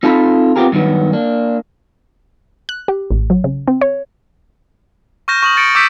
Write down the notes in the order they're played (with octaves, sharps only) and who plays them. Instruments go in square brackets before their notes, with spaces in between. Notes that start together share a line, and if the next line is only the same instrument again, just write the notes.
[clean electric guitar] C4 D#4 F4 A4 A5 B5
B3 C4 F4 G4 G#4 A#4
G2 D#3 F#3 B3
A#3 D4
[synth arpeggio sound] F#6
G4
A1
F#3
C#3
C4
C#5
[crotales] C#6 F6 G6 A#6 E7
C#6 D#6 F6 F#7
A6 C#7 D7
D6 E6 G6 B6 D7